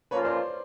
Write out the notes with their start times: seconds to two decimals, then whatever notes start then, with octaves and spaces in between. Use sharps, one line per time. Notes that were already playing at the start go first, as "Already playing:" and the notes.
0.11 F3 A#3 C#4 F4 B4 C#5
0.25 C5 D5